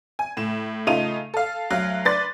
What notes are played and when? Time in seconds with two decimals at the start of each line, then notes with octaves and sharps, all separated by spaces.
0.19 G#5
0.37 A2 E7
0.87 C#3 A3 D#4 F4 D#7 F7
1.34 A4 F5
1.70 D2 F#3 F5 F#6
2.05 D4 B4 D5 C6 A6